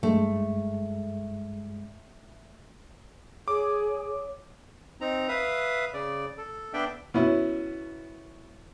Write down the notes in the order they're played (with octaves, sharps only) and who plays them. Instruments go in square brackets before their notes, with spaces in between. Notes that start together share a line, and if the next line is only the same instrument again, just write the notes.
[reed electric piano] G2 G#3 [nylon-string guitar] A3
[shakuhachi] G#4 [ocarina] C#5 [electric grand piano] D6
[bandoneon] C4 D#4 A#5
B4 E5 F5 D#6
C#3 D5
A4
B3 D4 D5 E5 G5
[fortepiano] B2 C#4 E4